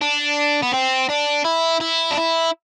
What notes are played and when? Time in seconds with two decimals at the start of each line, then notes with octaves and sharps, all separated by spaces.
0.02 D4
0.62 B3
0.73 C4
1.09 D4
1.45 E4
1.81 E4
2.11 D4
2.18 E4